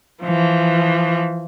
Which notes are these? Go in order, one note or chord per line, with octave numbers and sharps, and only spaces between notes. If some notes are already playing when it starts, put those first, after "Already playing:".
E3 F3